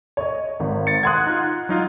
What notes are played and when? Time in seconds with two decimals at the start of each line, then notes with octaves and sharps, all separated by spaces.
0.17 C#5 D#5
0.60 G#1
0.87 A6 C#7
1.03 F#5 C6 D#6 F#6 G#6
1.27 D#4 F4
1.69 F#3 D#4 F4